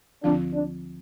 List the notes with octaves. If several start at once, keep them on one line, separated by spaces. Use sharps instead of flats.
D2 D3 F3 C4 D4 F4
D4